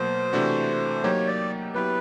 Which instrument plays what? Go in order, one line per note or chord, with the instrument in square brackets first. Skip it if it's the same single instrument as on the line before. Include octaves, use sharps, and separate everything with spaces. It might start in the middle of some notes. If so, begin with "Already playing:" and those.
Already playing: [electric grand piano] B2 F#3 A#3 [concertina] C5
[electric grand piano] C3 E3 A3 D4 F#4
[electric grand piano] F#3 A#3 D#4 G4 [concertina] C#5
[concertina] D5
[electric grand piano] F#3 B3 E4 G4 [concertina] B4